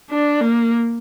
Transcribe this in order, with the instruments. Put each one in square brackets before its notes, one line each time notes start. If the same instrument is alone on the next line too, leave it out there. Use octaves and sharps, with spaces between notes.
[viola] D4
A#3